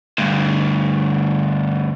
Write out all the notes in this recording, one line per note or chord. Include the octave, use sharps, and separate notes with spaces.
D2 G2